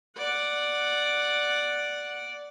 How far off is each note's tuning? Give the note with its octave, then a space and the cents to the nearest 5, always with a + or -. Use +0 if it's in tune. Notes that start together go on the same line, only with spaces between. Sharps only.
D5 +0 F#5 +0